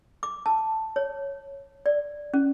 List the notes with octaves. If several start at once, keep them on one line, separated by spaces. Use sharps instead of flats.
D6
A5
C#5
D5
C#4